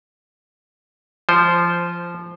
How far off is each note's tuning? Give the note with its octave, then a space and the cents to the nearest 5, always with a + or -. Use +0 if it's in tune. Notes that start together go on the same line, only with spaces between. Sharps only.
F3 -15 C5 +0